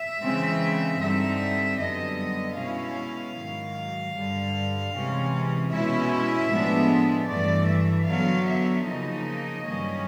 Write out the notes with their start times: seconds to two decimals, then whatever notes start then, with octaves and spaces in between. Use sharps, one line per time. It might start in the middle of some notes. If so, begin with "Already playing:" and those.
Already playing: E5
0.22 C#3 E3 G#3 C4
1.01 G2 D3 G3 C4 D#4 E5
1.79 F#2 D3 G3 B3 D#5
2.58 B2 G#3 C#4 E4 F5
3.36 G#2 D#3 F#3
4.15 G2 D3 G3
4.94 C3 E3 G#3 C#4
5.72 B2 G#3 C#4 E4 E5
6.51 A2 F3 G#3 B3 D4
7.28 G2 E3 A3 D5
7.68 E5
8.07 D3 F#3 B3 F5
8.47 E5
8.86 C#3 F3 A#3 D#4 D#5
9.64 G2 D#3 F#3 A#3 C#4